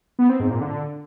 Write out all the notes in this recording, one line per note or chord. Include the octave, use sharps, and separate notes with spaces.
B3
C4
G#2
A#2
D3